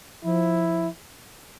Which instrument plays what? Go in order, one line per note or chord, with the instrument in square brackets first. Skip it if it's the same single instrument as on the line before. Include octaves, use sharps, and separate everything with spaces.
[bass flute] F3 [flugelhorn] E4